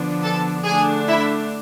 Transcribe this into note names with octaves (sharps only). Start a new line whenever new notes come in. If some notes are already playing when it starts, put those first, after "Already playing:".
Already playing: D3 F3 B3 D4
A4 A5
D3 A3 D4 G#4 G#5
E4 E5